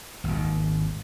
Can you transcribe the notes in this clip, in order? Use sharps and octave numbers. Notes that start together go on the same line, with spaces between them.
G#1 D#2